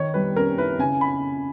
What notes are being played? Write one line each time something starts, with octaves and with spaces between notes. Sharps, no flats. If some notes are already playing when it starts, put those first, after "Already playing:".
Already playing: D#3 C#5
G3 B4
C#4 A#4
E4 B4
C#3 G#5
B5